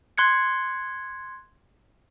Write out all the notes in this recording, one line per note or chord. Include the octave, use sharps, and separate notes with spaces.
C6 F#6 G#6 C#7